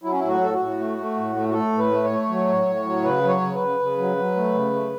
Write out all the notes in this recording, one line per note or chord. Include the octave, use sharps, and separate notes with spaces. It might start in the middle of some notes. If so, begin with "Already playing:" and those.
F#3 E4
C#4
A2 E4
F#4
A2 A4
F#4
A2
A3
A3
A2
A3
F#4
A3 A4
A2
B4
A3
C#5
A3
F#3
A2
A2
F#3
C#3 B4
F#3
C#5
C#3
B4
C#3
C#3
F#3
F#3
A3
C#3
A3